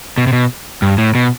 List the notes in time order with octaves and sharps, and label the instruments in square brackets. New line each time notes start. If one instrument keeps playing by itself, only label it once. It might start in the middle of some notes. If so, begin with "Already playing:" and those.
[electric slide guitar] B2
C3
B2
G2
A2
B2